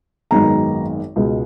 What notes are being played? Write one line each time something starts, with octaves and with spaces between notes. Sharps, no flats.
G#1 F#2 D#3 G#3 B3 A#5
C#2 B2 G#3